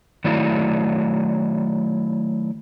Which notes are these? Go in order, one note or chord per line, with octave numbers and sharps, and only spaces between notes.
D#3 F#3 A3 E4 D5